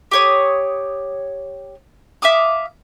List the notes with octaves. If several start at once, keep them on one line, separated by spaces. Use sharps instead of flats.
G4 C#5 D#6
E5 F5 D6 D#6